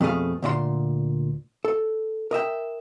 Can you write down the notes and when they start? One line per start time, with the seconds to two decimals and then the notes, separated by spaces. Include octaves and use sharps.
0.01 F2 B2 A3 G#4 F5
0.42 D2 A#2 F4 C6
1.65 A4
2.31 A#4 D#5 E5 G5